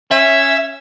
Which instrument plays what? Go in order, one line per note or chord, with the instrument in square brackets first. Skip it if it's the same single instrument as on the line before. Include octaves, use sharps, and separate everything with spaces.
[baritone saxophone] C#4 [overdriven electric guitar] E5